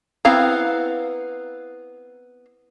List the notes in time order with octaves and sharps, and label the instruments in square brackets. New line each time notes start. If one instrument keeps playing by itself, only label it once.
[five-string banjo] B3 C4 E4 F5 A#5